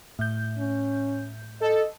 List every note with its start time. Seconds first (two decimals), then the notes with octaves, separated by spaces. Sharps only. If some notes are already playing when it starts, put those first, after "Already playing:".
0.19 A2 G6
0.58 C#4
1.61 A4 D#5